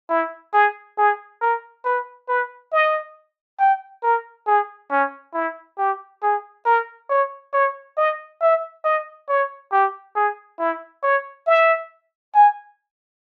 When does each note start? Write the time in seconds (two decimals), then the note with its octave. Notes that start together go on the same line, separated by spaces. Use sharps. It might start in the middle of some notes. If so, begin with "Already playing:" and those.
0.09 E4
0.53 G#4
0.98 G#4
1.41 A#4
1.85 B4
2.28 B4
2.72 D#5
3.60 G5
4.03 A#4
4.47 G#4
4.91 C#4
5.34 E4
5.78 G4
6.23 G#4
6.66 A#4
7.09 C#5
7.53 C#5
7.97 D#5
8.41 E5
8.84 D#5
9.29 C#5
9.72 G4
10.16 G#4
10.59 E4
11.03 C#5
11.47 E5
12.35 G#5